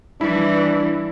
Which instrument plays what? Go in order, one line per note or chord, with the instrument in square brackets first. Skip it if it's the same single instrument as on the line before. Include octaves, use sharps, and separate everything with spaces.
[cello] E3 G3 [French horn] D4 [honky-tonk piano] E4